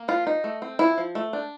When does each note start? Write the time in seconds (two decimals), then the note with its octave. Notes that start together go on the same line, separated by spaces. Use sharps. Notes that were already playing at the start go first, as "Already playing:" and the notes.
Already playing: A#3
0.08 F3 F4
0.27 D#4
0.44 A3
0.62 C4
0.79 F3 E4
0.98 F3
1.15 A3
1.33 D4